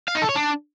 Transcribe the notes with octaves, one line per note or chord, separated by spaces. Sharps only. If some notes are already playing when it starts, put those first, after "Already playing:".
F5
D#4
A4
C#5
D4